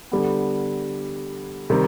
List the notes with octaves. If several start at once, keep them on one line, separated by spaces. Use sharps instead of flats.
D3 G3 B3
C3 D#3 G3